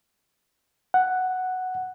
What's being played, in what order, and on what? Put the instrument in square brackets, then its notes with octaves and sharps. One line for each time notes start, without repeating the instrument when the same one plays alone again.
[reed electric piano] F#5